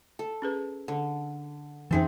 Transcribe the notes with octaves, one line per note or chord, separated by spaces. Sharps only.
A4
C#4 G#4 B4
D3
F2 E3 C4 C#4 D#4 G#4 C5 E5